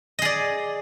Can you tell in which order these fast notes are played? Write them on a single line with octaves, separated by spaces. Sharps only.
D#5 G#4 D5